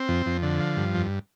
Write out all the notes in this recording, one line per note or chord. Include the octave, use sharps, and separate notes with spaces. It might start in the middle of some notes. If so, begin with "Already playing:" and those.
Already playing: C4
F2
F2
D3
F3
G2
F2